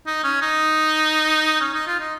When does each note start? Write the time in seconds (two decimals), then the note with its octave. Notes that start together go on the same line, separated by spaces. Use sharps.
0.06 D#4
0.23 C#4
0.41 D#4
1.61 C#4
1.73 D#4
1.87 F4
2.00 D#4